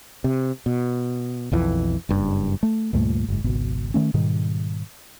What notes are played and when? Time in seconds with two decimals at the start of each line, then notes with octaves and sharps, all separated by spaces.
0.24 C3
0.66 B2
1.52 B1 F2 E3
2.09 F#1 G2
2.63 A3
2.93 C#2 G2 A#2 A3
3.28 F#1 G#2
3.44 G#1 C#2 B2
3.94 D#3 A3 C#4
4.14 G#2 B2 D#3 G3